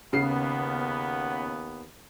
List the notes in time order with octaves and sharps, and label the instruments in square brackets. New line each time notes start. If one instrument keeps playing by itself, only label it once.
[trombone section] D#2 B3 [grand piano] C#3 C7